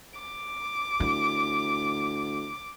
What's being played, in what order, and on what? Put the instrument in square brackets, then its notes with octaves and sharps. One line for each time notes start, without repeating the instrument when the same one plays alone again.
[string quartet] D6
[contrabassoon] D2 [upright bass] E4